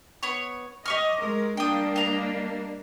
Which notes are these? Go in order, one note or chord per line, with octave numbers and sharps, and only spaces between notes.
B3 C#5
G4 D#5 C#6 F6
G#3 A#4
G3 A#3 D4 G5 D#6
D#5 A#5